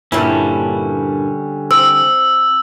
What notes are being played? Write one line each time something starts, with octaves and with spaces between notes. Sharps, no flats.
G2 A#2 D3 G3 C#4 E4
C4 E6